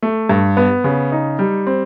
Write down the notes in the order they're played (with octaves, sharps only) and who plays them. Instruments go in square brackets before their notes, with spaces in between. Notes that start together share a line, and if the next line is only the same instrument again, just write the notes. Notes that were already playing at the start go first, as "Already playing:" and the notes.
[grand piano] A3
G2
B3
C#3
D#4
G3
C4